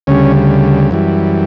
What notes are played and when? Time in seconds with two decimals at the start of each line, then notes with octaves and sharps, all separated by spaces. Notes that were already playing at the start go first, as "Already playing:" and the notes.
0.07 D2 C#3 G3 C#4
0.91 F#2 E3 G3